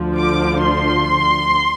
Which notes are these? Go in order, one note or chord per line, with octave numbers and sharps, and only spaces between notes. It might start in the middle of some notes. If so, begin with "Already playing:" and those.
Already playing: D2 D3 F3
D6
C6